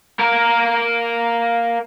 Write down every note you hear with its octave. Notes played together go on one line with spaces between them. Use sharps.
A#3 A#4